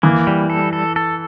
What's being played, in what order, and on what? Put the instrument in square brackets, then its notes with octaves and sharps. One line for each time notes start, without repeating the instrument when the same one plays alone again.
[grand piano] E3 [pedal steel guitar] A#3
[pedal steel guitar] G3
A4
A4
A4